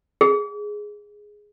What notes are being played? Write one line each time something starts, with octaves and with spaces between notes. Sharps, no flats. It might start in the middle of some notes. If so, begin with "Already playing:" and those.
G#4